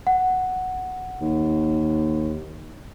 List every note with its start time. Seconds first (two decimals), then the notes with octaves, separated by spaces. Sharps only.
0.07 F#5
1.21 D#2